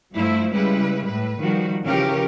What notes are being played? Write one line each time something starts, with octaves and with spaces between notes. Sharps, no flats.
G2 F3 A3 E4
C#3 G3 G#3 E4 B4
A2 B4
D#3 F3 G3 F#4
C#3 E3 F3 C#4 G4 A#4